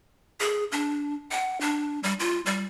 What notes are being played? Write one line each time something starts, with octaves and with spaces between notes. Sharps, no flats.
G#4
D4
F#5
D4
G3
F4
G3